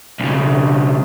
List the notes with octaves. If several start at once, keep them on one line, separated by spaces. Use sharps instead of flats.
B1 C#3